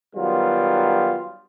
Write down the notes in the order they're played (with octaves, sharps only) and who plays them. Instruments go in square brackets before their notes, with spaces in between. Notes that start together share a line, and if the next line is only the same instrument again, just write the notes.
[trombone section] D#3 F#3 G3 B3 F4